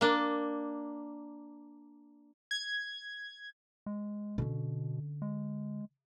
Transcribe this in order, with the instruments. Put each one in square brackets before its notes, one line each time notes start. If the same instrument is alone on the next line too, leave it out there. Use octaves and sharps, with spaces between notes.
[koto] A#3 D4
[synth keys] G#6
[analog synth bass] G#3
[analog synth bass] B2 [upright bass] D3 C#4
[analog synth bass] G#3